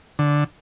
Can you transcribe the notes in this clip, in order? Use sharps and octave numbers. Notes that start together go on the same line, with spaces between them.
D3